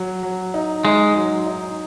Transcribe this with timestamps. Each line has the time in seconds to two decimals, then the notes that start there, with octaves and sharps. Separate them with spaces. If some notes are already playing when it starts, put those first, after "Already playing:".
Already playing: F#3
0.23 F#3
0.54 D#4
0.84 G#3 D#4
1.16 F#3
1.47 D#4